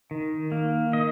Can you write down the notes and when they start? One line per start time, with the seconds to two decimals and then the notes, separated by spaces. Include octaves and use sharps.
0.11 D#3
0.52 A#3
0.93 D#3 D#5